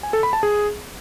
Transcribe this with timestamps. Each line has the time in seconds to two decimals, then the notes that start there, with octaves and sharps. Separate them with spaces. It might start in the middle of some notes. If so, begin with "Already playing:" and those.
0.03 G#5
0.13 A4
0.23 B5
0.33 A5
0.43 G#4